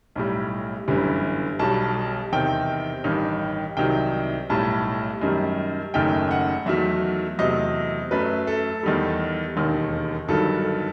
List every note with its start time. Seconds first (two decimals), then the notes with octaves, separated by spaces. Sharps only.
0.16 B1 A2 G3
0.88 G1 F#2 E3 G3
1.59 B1 B2 G3 A5
2.32 E2 C3 D#3 G5
3.04 A1 G2 D#3
3.77 C2 C3 D#3 F#3 G5
4.49 B1 A2 G3 A5
5.21 F#2 D#3 G3
5.94 F#1 F#2 D#3 A3 G5
6.31 F#5
6.66 E2 D#3 F#3 A3 E5
7.39 E2 C3 F#3 A3 D#5
8.11 F#2 F#3 A3 B4
8.47 A4
8.83 E2 D#3 G3
9.56 E1 D#2 D#3
10.28 G1 G2 D#3 F#3 A4